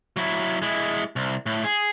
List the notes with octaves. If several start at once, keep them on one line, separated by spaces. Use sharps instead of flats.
F#3 E4
G#3 E4
C2
A2
G#4